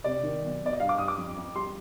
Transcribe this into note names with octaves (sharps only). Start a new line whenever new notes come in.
C3 D5
D#3
B1
B2 D5
D#5
G2 F5
D6
G2 D#6
D6
F2
F2
G3 C6